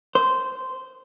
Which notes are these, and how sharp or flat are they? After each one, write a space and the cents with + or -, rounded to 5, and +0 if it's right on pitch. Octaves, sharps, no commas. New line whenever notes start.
C5 -10